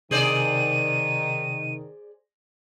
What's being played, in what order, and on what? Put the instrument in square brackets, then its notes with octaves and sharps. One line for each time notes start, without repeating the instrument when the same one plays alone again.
[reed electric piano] C3 [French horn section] D#3 [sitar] G#4 C5 D5 [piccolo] D#7